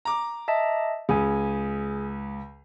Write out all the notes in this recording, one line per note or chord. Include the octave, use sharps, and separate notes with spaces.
A#5 D6
D#5 E5 A5
C#2 G#4 G#5